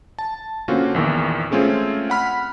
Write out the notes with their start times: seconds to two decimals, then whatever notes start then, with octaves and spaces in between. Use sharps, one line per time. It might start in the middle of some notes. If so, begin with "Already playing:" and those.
0.19 A5
0.68 D3 A#3 C4 C#4 F4 F#4
0.94 A#1 E2 D#3 E3
1.51 G#3 A3 C4 C#4 F4 G#4
2.10 F#5 B5 F6